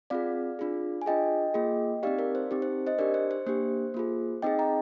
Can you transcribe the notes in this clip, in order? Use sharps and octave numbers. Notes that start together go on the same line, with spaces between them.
C4 F4 G#4 D5 F5
D4 F4 G#4
G#5
D4 F4 G#4 D#5 G5
A#3 F4 G#4
C4 D#4 G4 D5 F5
A#4 D5
C5
C4 D#4 G4
C5
C5 D#5
D4 G4 A#4 D5
C5
C5
A#3 D4 G4 C5
A#3 F4 G#4
C4 D#4 G#4 D#5 G5
G5 A#5